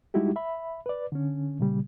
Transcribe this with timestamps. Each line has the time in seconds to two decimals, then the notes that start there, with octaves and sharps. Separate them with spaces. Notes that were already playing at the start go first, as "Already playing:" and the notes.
0.14 G3 G#3 D#4 E4 F#4 G4
0.36 E5 B5
0.86 B4 D5
1.12 D3 C#4
1.60 A#2 C#3 G3